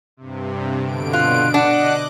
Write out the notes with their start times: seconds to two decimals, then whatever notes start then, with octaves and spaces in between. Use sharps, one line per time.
0.17 G2 C3
0.83 B2 D3 D7
1.13 F4 F#6
1.54 D4 D#5 F#5 D6 F#6